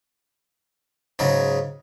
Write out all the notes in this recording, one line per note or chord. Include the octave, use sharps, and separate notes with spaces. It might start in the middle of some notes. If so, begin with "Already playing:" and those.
G#2 C#3 F#3